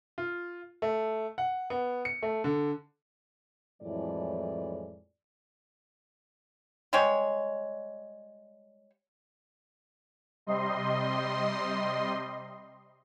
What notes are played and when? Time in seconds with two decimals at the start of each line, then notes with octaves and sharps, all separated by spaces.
0.18 F4
0.82 A3
1.38 F#5
1.70 B3
2.05 C#7
2.23 A3
2.44 D3
3.82 F2 A2 E3 F#3 G#3 D5
6.93 G3 G#3 C#5
10.46 C3 G3 D#5 C6